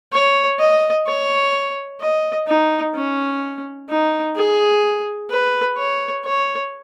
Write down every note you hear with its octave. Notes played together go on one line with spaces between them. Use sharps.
C#5
D#5
C#5
D#5
D#4
C#4
D#4
G#4
B4
C#5
C#5